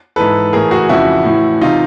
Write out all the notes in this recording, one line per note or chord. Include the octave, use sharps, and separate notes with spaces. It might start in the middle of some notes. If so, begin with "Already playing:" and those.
G#2 E3 A4 B4
A2 E3 G#4 A#4
F#4 G#4
F2 C#3 E3 E4 F#4
A2 E3
C3 E3 D#4 F4